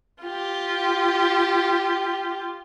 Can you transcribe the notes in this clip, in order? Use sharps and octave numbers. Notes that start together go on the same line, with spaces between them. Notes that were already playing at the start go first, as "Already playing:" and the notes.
F4 G4